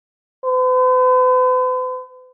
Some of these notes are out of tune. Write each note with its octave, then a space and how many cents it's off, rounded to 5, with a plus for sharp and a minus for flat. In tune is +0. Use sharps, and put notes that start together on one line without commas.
B4 +45